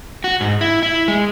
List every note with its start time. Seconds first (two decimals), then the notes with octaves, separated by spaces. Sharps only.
0.24 F#4
0.41 G#2
0.61 E4
0.83 E4
1.08 G#3